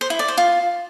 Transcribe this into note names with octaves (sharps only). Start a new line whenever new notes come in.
C5
E4
D5
C5
F4